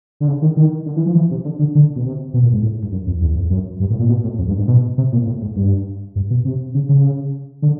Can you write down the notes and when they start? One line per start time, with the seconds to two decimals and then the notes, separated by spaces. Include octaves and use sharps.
0.20 D3
0.28 C#3
0.42 D#3
0.57 D#3
0.86 D3
0.96 E3
1.06 F3
1.15 E3
1.31 C3
1.45 D3
1.59 D3
1.75 D3
1.96 B2
2.04 C3
2.34 B2
2.43 A#2
2.53 G#2
2.63 A2
2.83 G2
2.92 F#2
3.07 F2
3.21 E2
3.36 F2
3.50 F#2
3.80 G2
3.91 A2
3.99 A#2
4.09 B2
4.24 A2
4.38 F2
4.49 G2
4.59 G#2
4.68 B2
4.98 C3
5.13 A#2
5.27 A2
5.42 G#2
5.56 G2
6.16 G2
6.30 B2
6.45 C3
6.74 C#3
6.89 C#3
7.62 D3